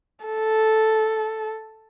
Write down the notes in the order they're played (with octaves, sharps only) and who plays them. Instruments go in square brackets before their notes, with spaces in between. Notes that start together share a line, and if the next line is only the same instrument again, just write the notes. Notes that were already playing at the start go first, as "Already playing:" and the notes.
[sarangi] A4